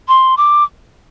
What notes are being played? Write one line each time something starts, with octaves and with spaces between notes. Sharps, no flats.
C6
D6